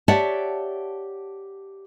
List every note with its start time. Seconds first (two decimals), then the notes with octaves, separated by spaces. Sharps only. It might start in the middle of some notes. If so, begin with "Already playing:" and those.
0.08 G4 C#5 D5 E5 F#5 A5